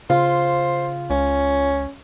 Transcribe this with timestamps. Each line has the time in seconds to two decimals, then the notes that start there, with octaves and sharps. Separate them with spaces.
0.10 C#3 F4 C5
1.10 C#2 C#4